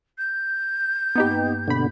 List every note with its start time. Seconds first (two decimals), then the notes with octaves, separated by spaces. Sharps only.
0.18 G6
1.16 G2 A#3 B3 D#4 G4
1.68 D2 B2 D3 B5